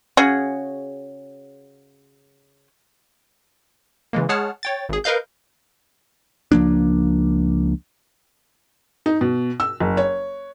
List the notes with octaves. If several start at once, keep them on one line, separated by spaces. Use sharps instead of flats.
C#3 C#4 F#4 G#4
C#3 E3 G#3 A#3
G#3 G#4 C#5 F#5 A5 F6
C#5 G5 A6
G#1 G#4
A#4 B4 D#5 F5 G6
C#2 F3 A#3 D4
D#4
B2
E6
F#1
C#5